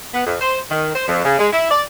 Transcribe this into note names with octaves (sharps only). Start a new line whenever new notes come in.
B3
F2
C5
D#3
C5
F2
C#3
G#3
E4
D5